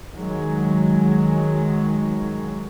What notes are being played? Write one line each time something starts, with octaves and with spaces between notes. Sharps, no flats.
D#3 F#3 G#3